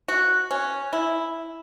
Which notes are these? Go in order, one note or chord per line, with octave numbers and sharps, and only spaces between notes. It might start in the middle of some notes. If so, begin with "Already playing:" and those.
F#4
C#4
E4